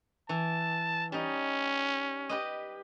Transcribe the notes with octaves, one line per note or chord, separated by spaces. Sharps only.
E3 A5
G3 C#4 D#4
G4 B4 D#5